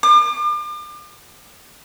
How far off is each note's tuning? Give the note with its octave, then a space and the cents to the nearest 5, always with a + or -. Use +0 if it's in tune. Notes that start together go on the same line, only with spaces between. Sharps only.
D6 +40